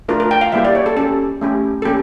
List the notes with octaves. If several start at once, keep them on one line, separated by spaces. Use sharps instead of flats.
A3 D4 F4 A#4
A#4
G5
F5
G3 A#3 E4 G4 E5
D5
C#5
A4
C#4 G4 A4
A3 C#4 G4
A4
A#3 C#4 G4